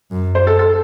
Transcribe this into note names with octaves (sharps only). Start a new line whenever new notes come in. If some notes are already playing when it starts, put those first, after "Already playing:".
F#2
C5
A4
A4